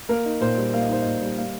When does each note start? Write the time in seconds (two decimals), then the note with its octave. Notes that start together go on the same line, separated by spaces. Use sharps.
0.09 A#3 A#4
0.25 D#4
0.41 A#2 C5
0.58 G3
0.74 A#3 F5
0.83 D#5
0.89 D#4 C5
1.02 A#2 D#5
1.22 G3
1.38 A#3 F5